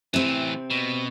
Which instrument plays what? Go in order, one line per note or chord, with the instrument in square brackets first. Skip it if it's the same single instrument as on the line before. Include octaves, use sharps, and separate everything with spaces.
[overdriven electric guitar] A2 E3 [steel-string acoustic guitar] C3 C4
[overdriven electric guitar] B2